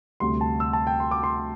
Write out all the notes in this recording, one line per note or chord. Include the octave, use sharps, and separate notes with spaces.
D2 C3 G3 C6
A5
E6
A5
G5
C6
D6
C6